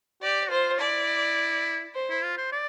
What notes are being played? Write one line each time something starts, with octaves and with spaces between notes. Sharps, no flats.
G4 D5
F4 C5
E4 D5
C5
E4
F4
C5
D5